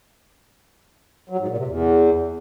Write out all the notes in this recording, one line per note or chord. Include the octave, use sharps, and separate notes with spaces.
F#3
G#2
A#2
C3
E2